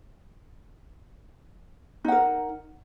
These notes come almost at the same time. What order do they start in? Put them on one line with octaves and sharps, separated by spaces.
D#4 F#5 A#4